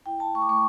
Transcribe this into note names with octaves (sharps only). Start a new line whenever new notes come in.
E4 G5
E4 A5
A3 C#6
D6
A3 C#6